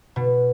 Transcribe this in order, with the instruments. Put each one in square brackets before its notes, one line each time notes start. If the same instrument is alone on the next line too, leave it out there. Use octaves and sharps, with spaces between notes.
[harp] B2